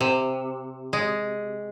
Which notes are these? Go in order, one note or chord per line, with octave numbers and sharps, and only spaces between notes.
C3
G#3